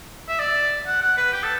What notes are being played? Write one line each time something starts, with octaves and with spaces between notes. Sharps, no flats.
E5
D5
F#5
F#5
B4
G4
A4